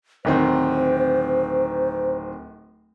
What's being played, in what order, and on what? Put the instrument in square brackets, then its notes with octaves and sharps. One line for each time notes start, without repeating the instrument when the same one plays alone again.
[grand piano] D1 D#3 C4 [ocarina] C5